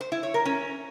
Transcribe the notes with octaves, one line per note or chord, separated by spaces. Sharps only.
C5
E4
C#5
A#4
C#4